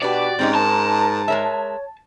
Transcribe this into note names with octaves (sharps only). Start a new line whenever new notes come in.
B2 D4 F#4 G4 B4 D5 D6
G#2 C4 C#4 D#4 G4
A#4 A5
G#3 A#4 C#5 E5